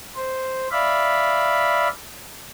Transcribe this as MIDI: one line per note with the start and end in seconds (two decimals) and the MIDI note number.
0.16 0.68 72
0.72 1.88 74
0.72 1.88 76
0.72 1.88 77
0.72 1.88 83